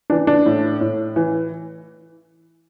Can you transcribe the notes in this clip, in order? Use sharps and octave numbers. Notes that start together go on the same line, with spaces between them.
E3 D4
D4
A2
A2
E3